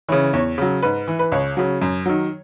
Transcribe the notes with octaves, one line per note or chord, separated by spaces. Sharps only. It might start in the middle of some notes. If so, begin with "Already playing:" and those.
C#3 E3 C#5
E2 C#5
C#3 F#3
G#2 B4
E3
B4
C#2 C#5
C#3 F#3
F#2
D#3 F#3